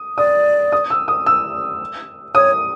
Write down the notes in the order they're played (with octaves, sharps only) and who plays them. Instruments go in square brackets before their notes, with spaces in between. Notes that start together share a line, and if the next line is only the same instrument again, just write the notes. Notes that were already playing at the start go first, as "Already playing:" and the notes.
Already playing: [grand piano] D#6
[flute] D5 [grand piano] D#6
[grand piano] D#6
E6
D#6
E6
[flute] C#5 [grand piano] D#6